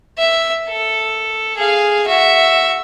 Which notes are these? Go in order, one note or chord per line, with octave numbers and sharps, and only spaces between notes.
E5
A4
G#4 F5
F#4 E5